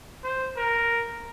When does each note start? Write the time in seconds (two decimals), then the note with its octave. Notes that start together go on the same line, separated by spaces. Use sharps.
0.24 C5
0.57 A#4